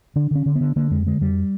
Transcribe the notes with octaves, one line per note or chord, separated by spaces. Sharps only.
D3 D4
D3 C#4
D3
B3
D3
D3 A#3
F2 G#3
D3 G#3
F2 G3